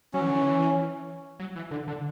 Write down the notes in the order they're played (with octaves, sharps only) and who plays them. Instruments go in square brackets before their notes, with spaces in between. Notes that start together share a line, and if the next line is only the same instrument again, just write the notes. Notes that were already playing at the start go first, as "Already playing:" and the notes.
[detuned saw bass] F#3 [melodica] C#4
[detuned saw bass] E3
D3
E3
F#3
E3
D3
D3